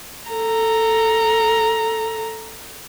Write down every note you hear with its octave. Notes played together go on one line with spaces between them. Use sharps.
A4 A#5